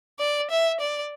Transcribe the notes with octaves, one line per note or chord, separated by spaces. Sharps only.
D5
E5
D5